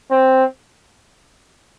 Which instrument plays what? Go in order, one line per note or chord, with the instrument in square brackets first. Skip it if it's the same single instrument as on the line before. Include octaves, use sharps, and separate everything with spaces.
[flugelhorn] C4